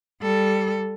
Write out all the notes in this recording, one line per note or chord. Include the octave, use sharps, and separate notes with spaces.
G3 A4